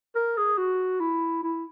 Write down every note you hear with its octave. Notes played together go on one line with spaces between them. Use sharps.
A#4
G#4
F#4
E4
E4